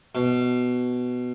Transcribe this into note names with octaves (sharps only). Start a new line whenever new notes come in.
B2